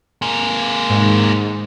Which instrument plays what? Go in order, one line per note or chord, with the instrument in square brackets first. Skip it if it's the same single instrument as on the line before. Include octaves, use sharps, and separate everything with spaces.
[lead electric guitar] G#3 A#3
[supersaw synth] G#2